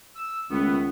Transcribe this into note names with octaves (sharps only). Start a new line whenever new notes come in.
E6
C#2 D#3 A3 B3